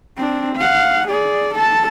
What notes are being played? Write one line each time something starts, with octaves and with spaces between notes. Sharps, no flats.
C4 D4
F5 F#5
G#4 D5
A4 A5